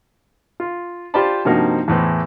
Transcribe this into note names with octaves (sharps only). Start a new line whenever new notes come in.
F4
F4 G4 C5 D5 A5 B5
G2 C3 F3 A#3 D#4 F#4
E2 A2 E3 C5